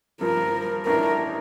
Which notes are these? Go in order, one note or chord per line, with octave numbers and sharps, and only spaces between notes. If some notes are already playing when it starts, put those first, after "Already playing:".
G2 F3 C4 A#4
A1 A2 A3 D4 A#4